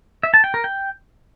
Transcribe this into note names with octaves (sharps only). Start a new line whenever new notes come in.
E5
A5
G5
A#4
G5